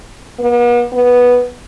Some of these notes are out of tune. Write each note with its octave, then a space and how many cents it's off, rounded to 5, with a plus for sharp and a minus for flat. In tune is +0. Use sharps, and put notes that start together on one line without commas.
B3 -45
B3 -5